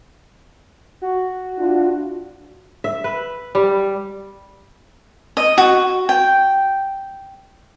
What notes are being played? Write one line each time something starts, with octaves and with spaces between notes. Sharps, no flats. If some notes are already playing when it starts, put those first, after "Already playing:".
F#4
D4 E4 F4
E5
B4
G3
D#5
F#4
G5